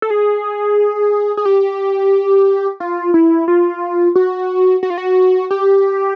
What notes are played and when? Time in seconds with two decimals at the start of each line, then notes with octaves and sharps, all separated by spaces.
0.02 A4
0.10 G#4
1.37 G#4
1.45 G4
2.80 F4
3.14 E4
3.48 F4
4.15 F#4
4.83 F#4
4.90 F4
4.98 F#4
5.51 G4